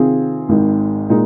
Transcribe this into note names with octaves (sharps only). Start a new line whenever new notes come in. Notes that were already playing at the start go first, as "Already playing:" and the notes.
Already playing: C3 D#3 C4 F4 G#4
G#1 G#2 D#3
A#2 G#3 D#4